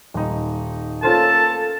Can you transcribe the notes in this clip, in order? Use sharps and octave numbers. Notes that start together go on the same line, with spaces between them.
D#1 D#4
A3 A#3 C#4 F4 A4 C5 A5